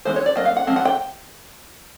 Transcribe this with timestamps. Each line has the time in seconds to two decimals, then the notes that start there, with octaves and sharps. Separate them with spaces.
0.05 E3 G#3 B3 D#4 C5
0.16 C#5
0.26 D5
0.36 F#3 A#3 D#5
0.45 F5
0.57 F#5
0.67 F3 G#3 C4
0.76 F#5
0.85 G5